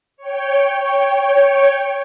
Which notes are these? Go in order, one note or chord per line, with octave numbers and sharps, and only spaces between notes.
C#5 G5